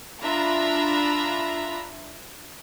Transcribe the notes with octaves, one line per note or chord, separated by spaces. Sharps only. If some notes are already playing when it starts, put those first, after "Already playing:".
D4 F4 E5 A#5 B5